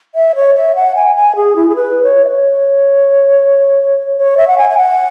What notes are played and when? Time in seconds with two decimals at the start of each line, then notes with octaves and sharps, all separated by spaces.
0.15 E5
0.35 C#5
0.55 E5
0.76 F#5
0.95 G#5
1.15 G#5
1.36 G#4
1.56 E4
1.69 G#4
1.76 B4
2.03 C#5
2.25 E5
2.30 C#5
4.17 C#5
4.37 E5
4.48 F#5
4.58 G#5
4.70 G#5
4.78 F#5